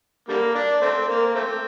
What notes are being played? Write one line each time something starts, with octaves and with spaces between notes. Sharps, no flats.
D3 G3 A#3
D4
A3 C4
A#3
A3 C4